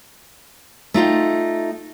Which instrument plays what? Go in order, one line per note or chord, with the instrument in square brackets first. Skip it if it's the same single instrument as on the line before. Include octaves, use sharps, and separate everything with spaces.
[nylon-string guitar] A3 D#4 F4 G5